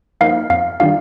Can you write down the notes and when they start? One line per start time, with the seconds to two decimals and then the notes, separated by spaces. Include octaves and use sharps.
0.21 F3 A#3 D#4 F5
0.50 F2 F5
0.80 D#3 G3 D4 F4 F5